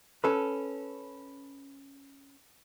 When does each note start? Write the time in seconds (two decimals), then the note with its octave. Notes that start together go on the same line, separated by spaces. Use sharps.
0.24 C#4 A4 B4